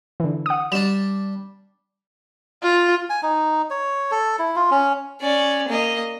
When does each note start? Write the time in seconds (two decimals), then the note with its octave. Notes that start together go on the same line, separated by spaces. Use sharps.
0.20 D3 E3
0.46 F#5 D#6
0.72 G3 D4 E7
2.63 F4
3.10 G#5
3.23 D#4
3.70 C#5
4.11 A4
4.39 E4
4.56 F4
4.71 C#4
5.21 C#4 D5
5.68 A#3 D#5